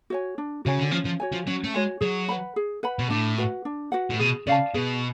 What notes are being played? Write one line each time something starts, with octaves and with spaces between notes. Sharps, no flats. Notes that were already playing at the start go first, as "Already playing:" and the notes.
F#4 C#5 G#5
D4
C#3 F#4 C#5 G#5
D3
F3 C#4
F3
F#4 C#5 G#5
F3
F#3 C#4
A3
G#3 F#4 C#5 G#5
F#3 G#4
B4 F#5 B5
G#4
B4 F#5 B5
B2
A2 D4
F#4 B4 F#5
D4
F#4 B4 F#5
A2
B2 G#4
C#3 D5 F5 A5
B2 G#4